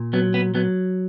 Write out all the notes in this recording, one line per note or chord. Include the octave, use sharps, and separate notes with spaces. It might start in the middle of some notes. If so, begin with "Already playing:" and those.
Already playing: A#2
F#3 B3
B3
F#3 B3